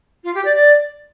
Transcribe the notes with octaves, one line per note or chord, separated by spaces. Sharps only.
F4
G4
D5
D5